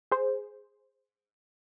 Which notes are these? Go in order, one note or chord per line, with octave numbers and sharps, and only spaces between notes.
G#4 C5